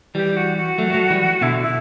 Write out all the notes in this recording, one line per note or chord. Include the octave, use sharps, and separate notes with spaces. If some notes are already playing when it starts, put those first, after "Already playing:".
E3 G3 G4
F#4
F#4
F#3 A3
G3
F#3 A3
E3 G3
B2 D3 E4
E4